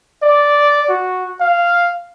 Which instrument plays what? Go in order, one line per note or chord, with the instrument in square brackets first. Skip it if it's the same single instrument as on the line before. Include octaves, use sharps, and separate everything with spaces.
[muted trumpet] D5
F#4
F5